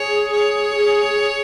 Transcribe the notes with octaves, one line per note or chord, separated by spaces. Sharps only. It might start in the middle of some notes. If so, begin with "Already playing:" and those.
Already playing: G#4 C#5
C#5
G#4